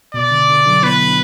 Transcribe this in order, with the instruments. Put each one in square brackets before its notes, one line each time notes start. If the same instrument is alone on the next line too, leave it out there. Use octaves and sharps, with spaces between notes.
[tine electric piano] B2 [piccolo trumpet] D5
[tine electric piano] D3
D3
D3 F#3
[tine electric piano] B3 E4 [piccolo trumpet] B4
[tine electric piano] D4